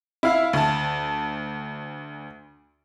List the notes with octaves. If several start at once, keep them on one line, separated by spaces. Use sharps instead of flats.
E4 F5
D2 A5